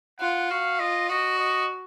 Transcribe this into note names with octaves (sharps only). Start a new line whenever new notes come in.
F4 F#5
F#4 F5
F4 D#5
F#4 D#5
D#5